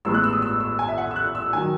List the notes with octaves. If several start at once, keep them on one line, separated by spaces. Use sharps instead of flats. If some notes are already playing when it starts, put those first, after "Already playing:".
A1 A2 G#3 B3 E6
F#6
E6
D#6
E6
E6
G#5
E5
F#5
E6
F#6
E6
D#3 F#3 G#5